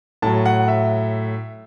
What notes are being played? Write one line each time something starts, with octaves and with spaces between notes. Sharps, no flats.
A2 F#3 A5
F#5
E5